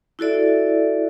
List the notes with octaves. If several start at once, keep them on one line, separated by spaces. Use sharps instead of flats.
E4 F#4 A4 D5 E5